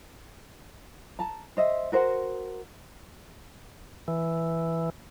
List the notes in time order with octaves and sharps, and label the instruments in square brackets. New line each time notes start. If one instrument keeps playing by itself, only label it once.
[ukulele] A5 A#5
C5 D#5 E5
F#4 A#4 C5 F#5
[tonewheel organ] E3